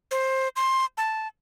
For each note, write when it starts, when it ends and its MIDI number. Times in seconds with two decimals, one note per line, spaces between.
0.11 0.48 72
0.56 0.85 84
0.97 1.27 81